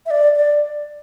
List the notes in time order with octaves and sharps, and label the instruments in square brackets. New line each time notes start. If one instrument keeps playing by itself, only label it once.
[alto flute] E5
D5
D5